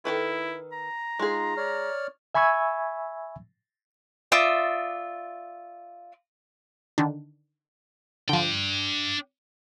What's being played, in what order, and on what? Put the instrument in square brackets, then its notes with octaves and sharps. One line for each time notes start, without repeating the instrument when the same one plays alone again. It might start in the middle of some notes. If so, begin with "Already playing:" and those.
[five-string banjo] D#3 A4 B4 [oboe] E4
[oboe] A#5
[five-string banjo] G#3 G#4 [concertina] D#4 F4
[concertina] C#5 D5 F6
[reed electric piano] E5 G#5 B5 C#6 E6 G#6
[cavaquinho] F4 D5 E5 D#6
[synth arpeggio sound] D3 D#3 D4
[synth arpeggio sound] D3 F3 [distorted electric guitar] D4 G5